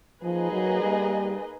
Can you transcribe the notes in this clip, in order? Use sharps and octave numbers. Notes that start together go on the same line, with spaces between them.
F3 A#3 D#4 G#4 B4 D#5
F#3
G3